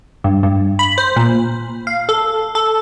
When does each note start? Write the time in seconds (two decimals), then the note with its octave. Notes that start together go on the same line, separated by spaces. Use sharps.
0.24 G2
0.43 G2
0.79 B5
0.98 C5
1.16 A#2
1.87 F5
2.09 A4
2.55 A4